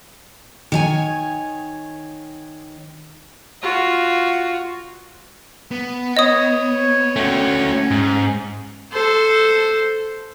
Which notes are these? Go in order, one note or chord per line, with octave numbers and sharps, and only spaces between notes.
D#3 C#5 G#5
F4 F#4
B3
C#5 D#5 D#6
A3 C#4 F#4 G5
G#2
A4 C5